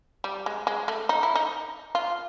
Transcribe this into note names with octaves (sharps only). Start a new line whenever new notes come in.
G3
G#3
G#3
A3
D#4
E4
D#4
F4